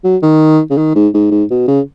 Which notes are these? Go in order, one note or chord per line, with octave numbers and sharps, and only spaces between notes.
F#3
D#3
C#3
D#3
G#2
G#2
G#2
B2
C#3